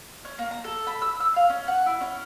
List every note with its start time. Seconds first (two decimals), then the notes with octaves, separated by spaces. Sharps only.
0.25 C#4
0.39 A#3
0.51 A#5
0.64 A4
0.87 B5
1.02 E6
1.20 E6
1.36 F5
1.50 C#4
1.68 F#5
1.86 E4
2.01 C#4